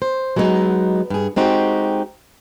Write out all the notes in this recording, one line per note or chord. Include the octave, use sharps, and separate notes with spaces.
C5
F#3 G#3 B3 C4 D#4
G2 G#4
G#3 C4 D#4 F#4 G4